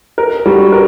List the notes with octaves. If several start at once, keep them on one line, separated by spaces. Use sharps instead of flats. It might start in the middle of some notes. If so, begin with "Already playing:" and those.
A#4
G3 D4 F#4
A#4